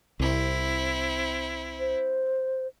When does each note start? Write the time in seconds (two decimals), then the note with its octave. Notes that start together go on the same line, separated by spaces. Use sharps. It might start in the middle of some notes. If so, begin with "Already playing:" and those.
0.20 C2 C4 E4
1.80 C5